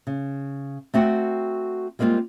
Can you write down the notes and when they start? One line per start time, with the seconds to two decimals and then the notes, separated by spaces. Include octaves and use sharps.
0.07 C#3
0.94 A3 C4 F#4 F#5 G5
1.99 G3 G#3 A#3 C4 F4